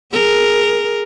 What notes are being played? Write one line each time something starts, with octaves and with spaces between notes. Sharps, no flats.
G#4 A#4